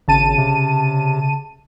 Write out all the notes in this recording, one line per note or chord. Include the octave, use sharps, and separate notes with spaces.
G#1 C#3 A5 D#7
C3